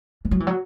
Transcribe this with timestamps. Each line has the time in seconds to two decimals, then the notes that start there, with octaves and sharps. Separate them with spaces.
0.25 E3
0.31 F#3
0.40 E3
0.47 F#3